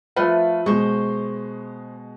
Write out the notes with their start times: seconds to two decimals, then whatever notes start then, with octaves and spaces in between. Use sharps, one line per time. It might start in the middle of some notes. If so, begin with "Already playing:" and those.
0.16 F3 A3 F4 B4 F6
0.66 B2 G#3 C5 C#6